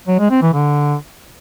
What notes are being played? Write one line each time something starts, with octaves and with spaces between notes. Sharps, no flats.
F#3
G#3
C4
E3
D3